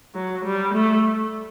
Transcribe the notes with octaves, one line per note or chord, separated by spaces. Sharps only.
F#3
G3
A3